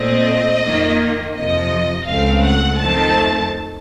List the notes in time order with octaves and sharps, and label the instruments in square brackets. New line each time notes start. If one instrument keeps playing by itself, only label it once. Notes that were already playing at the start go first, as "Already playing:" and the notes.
Already playing: [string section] A#2 A3 C4 D#5
F2 D#3 A#3
F2 C3 F3 D#5
C#2 C#3 A3 C4 F5
F#5
F2 D#3 A3 C4 A5